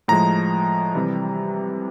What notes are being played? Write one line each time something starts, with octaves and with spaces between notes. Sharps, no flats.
A2 F3 G#3 A#5
C3 E3 G3